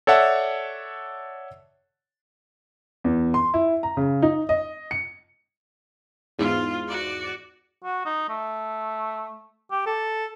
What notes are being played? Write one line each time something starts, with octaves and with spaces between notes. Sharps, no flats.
A4 C#5 D5 E5 F#5 A5
E2
C6
E4
A#5
C#3
D#4
D#5
C#7
E2 G#2 F4
F#4 D5
F#4
D#4
A3
G4
A4